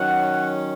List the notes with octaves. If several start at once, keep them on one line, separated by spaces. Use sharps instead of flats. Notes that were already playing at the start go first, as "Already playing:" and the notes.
Already playing: D#3 F#3 C#4 F#5